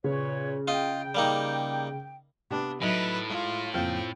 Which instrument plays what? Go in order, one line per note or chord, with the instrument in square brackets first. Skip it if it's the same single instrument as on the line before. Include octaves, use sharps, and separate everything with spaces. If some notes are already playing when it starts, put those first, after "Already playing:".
[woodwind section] A#2 B4 C#5 [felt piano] C#3
[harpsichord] F4 D#5 [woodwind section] G5
[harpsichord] G3 A#3 D#4
[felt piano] C3 B3 D5 [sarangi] D4 [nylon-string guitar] G4
[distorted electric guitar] A2 [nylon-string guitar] F#3 [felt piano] D#4 D#5 E5 [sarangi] B4
[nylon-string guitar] G#3 [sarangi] F4
[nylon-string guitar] F2 C#3 A#3 [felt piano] C4 F4 [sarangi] G5